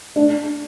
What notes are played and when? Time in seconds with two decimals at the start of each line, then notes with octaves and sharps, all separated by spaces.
0.16 D4